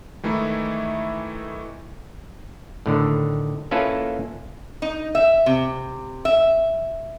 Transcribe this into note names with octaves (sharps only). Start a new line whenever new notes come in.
D#3 E3 G#3 A3 D#4 E4
A2 D3 D#3
A#3 C#4 E4 F4 A4 B4
D#4
E5
C3
E5